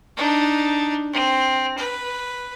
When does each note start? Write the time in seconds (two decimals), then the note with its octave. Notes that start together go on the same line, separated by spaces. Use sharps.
0.17 D4 D#4
1.12 C4
1.78 B4